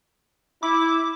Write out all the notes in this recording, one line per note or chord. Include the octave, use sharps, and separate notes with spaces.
E4 D6